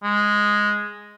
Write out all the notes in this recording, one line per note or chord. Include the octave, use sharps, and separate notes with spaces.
G#3